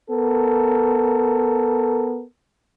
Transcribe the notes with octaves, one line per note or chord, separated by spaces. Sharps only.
B3 A4 A#4